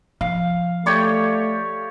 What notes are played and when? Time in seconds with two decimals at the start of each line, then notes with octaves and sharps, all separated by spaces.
0.21 F3 F5
0.86 A3 G4 C#5 D5